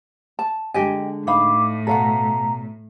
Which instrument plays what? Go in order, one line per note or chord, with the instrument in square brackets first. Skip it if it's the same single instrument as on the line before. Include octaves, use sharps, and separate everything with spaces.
[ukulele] A5
[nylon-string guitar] D3 G#3 G#4 [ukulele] G4 D#5 G#5
[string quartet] A2 [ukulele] D#4 F5 B5 [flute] D6
[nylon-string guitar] B2 C#5 [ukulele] A4 F5 F#5 [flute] A#5